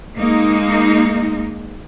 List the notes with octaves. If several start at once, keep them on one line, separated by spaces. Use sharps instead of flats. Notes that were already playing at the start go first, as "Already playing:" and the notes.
G#3 A#3 D#4